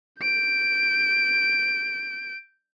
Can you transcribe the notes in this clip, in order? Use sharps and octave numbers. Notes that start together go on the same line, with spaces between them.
G6 D7